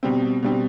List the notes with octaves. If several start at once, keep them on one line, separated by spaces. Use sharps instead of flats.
B2 G3 C4
B2 G3 C4